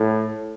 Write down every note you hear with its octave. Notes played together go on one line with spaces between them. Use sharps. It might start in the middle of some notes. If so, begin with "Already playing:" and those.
Already playing: A2